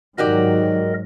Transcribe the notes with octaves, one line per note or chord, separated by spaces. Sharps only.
G#2 D#3 F#3 F#4 G4 A#4 D5 D#5